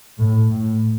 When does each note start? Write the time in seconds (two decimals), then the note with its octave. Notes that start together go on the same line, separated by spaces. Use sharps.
0.18 A2
0.49 A2